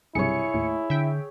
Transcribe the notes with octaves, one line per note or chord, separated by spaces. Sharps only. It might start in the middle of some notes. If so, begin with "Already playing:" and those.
B1 G2 C3 E4 G#4 C#5 C#7
D#2 A2
D3 E5 G5